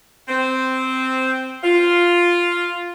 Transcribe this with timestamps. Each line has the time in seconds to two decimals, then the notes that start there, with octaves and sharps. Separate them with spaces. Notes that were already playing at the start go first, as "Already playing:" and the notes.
0.28 C4
1.64 F4